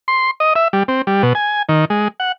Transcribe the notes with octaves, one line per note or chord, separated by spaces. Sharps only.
C6
D#5
E5
G3
C4
G3
B2
G#5
D#3
G#3
F#5